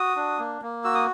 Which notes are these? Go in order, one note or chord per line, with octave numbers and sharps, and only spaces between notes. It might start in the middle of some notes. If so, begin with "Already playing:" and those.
Already playing: F#4 D#6
D4
A#3
A#3
F#4 E6
D#6